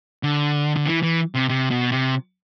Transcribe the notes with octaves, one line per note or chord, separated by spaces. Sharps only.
D3
D3
E3
E3
C3
C3
B2
C3